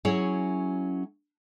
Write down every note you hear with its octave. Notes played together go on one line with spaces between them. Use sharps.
F#3 C#4 E4 G#4 C#5